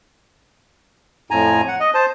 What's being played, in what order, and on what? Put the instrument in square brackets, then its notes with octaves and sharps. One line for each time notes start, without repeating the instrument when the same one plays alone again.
[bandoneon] F2 A2 G#5 A#5
F#5
D#5
C5 A5